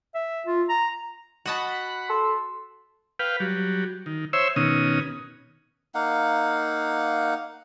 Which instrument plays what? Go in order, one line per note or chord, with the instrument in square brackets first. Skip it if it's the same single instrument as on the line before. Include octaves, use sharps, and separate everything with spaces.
[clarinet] E5
F4
A#5
[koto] F#4 D#5 A5 [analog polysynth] F#5 B5
[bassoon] A4 [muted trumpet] C6
[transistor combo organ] B4 F5 G5
F#3 G3
D#3
C5 C#5 E5 E6
B2 D#3 C#4 D#6
[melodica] A#3 D#4 F5 F#5